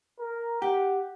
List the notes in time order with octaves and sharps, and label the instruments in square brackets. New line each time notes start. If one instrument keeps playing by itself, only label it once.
[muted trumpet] A#4
[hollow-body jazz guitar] G4 [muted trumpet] F#5